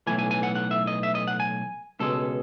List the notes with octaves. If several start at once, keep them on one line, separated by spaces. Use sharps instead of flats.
B1 A2 E3 G#5
G#5
G#5
F#5
F#5
E5
D#5
E5
D#5
F#5
G#5
C#2 B2 G#3 A4